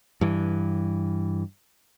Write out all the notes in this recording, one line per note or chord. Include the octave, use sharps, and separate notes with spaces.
G2 E3